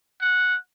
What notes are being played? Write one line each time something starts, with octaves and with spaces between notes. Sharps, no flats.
F#5